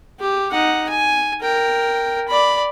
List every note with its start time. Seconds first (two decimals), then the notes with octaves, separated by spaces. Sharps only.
0.21 G4
0.52 D#4 F#5
0.89 G#5
1.42 A#4 G5
2.28 D5 B5